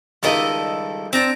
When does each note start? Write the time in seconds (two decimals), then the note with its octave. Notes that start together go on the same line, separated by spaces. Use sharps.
0.23 C#2 D#3 G3 E4 A4 D#5
1.13 C4 D4 A#5 D6